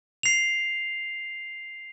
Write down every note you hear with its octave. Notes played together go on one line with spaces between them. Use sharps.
C7 F7